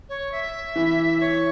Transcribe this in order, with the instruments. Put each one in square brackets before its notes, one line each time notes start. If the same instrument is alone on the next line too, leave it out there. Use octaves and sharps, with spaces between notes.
[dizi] C#5
E5
[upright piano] E3
[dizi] C#5